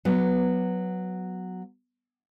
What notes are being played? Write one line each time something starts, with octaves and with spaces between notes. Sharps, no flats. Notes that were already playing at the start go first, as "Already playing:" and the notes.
F#3 B3